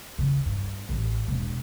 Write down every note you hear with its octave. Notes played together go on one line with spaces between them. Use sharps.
C#3
G2
A1
E1